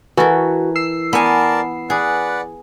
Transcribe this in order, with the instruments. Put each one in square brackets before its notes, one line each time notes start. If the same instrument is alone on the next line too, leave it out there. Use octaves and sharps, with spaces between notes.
[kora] E3 [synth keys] F#4 [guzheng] A4 A#4
[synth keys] E6 C7
[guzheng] B3 G#5 [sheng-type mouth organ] A#4 D5 A5
[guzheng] G#4 [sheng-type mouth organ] B4 D5 F#5